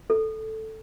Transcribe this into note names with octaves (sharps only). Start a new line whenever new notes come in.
A4